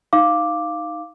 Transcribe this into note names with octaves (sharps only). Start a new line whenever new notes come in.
D#4 F5 D6